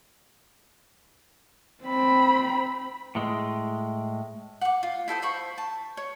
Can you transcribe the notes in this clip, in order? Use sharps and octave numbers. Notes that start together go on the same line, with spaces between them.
C4 B5
A2 G#3
F#5 D6
F4
E4 A4 C5 D#6
C5 B5 C#6
A5
C#5